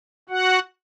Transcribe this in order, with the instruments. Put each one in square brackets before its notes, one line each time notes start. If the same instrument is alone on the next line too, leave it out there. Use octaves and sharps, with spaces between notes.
[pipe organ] F#4 F#5